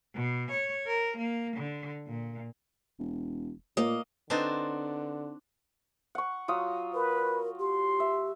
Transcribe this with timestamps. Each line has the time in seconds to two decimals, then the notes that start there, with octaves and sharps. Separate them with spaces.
0.15 B2
0.52 C#5
0.87 A#4
1.18 A#3
1.57 D3
2.07 A#2
2.99 E1
3.77 A#2 A#3 D#5
4.30 D3 C4 D4 D#4 F#4 B4 C5 A6
6.15 F#5 C#6
6.48 F#3 F4 D#6
6.94 A#4 B4
7.59 G4 C6
8.00 E5